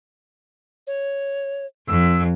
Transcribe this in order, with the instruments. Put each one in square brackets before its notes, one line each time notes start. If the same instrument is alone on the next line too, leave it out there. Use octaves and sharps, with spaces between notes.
[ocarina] C#5
[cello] F2 [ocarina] E6